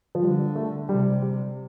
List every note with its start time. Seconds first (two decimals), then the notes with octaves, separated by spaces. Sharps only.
0.15 F3
0.22 D3 G3
0.55 A3
0.89 C3 G3
1.22 G3